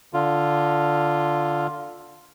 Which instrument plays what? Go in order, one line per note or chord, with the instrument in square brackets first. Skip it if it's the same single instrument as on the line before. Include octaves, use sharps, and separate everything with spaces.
[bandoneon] D3 F4